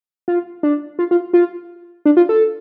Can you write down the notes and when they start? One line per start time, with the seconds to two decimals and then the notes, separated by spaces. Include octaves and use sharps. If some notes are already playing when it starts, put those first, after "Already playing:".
0.28 F4
0.63 D4
0.99 F4
1.11 F4
1.33 F4
2.05 D4
2.17 F4
2.29 A4